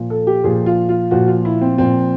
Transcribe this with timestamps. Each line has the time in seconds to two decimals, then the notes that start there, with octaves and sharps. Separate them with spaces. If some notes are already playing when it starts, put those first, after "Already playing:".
Already playing: A#2 F3
0.10 A4
0.27 G4
0.44 A#2 F3 G#4
0.66 F4
0.89 F4
1.11 A#2 F3 F#4
1.28 F4
1.45 E4
1.61 C4
1.78 A#2 F3 C4